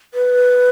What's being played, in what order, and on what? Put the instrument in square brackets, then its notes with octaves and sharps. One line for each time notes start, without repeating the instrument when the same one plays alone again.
[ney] B4